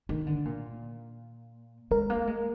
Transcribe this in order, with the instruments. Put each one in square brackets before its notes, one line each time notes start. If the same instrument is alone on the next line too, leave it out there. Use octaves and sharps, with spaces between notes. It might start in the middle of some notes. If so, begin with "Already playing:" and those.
[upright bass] D#3
D3
A#2
[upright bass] G#3 [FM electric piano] A#4
[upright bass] A#3
G#3